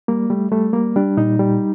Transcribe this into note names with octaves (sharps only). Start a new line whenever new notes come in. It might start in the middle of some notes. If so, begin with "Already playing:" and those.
G3 A#3
G3 A3
G3 A3
G3 A#3
G3 D4
A#2 D#4
G3